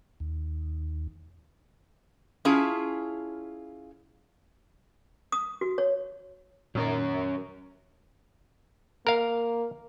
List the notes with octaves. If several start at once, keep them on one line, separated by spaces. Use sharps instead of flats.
D#2
C#4 E4 F4 G#4 A5
D#6
F#4
C#5
A#2 D#3 F#3 C#4 A#4
A#3 A#4 F5